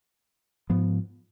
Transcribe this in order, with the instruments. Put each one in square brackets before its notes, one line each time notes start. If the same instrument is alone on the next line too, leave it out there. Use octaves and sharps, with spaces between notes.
[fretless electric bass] G#2 F3 B3